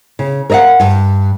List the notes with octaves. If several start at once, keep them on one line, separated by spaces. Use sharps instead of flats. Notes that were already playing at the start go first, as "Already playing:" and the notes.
C#3
A#4 C#5 D#5 F5 F#5
G2